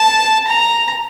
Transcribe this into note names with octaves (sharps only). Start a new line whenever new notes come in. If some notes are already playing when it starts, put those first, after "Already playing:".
Already playing: A5
A#5